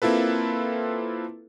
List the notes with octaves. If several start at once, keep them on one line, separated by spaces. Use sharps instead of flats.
A#3 C4 E4 F4 A4 B4